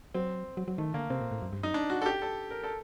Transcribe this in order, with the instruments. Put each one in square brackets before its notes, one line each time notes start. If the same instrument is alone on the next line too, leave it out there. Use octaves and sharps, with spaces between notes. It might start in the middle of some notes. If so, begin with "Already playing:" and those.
[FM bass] F#3 [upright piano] C4
[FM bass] F#3
F#3
[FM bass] D#3 [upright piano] A3
[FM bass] D3 [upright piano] A#3
[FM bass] C3 [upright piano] C4
[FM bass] A#2
A2
F#2
G2
[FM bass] F#2 [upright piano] D#4
[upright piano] D4
F#4
A4
G4
A4
A#4
A4